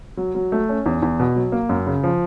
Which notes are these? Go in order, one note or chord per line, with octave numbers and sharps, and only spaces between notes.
F#3
F#3
A3
C#4
E2
E2
B2
F#3
A#3
F#2
C#3
F3